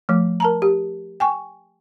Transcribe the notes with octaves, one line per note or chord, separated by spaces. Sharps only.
F3 A3
A#4 A5 A#5
G4
G5 G#5 C#6